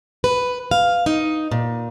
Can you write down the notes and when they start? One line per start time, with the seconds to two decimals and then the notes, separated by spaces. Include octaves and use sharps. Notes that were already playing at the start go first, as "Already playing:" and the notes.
0.24 B4
0.71 F5
1.06 D#4
1.51 A#2